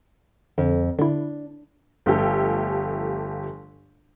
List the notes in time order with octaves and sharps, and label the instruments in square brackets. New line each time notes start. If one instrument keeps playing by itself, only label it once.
[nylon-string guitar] F2 [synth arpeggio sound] D3
[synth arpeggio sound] D3 E4 [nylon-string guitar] D4
[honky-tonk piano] G1 F3 A3 G4 A4 G#5